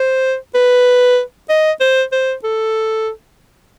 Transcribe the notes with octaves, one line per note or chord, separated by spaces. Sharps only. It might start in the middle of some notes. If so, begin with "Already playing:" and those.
Already playing: C5
B4
D#5
C5
C5
A4